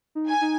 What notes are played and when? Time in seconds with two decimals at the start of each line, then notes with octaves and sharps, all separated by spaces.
0.15 D#4
0.28 G#5
0.41 D#4